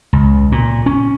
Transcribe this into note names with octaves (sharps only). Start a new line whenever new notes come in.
C#2
A#2
C#4